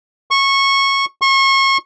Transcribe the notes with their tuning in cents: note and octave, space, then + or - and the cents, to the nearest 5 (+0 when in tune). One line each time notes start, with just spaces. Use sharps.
C#6 -15
C#6 -35